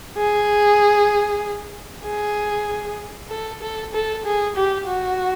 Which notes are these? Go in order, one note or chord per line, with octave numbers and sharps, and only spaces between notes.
G#4
G#4
A4
A4
A4
G#4
G4
F#4